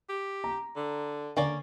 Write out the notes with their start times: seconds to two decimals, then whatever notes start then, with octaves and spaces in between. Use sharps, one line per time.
0.09 G4
0.44 A#5
0.76 D3
1.37 D3 A#3 C#4 D5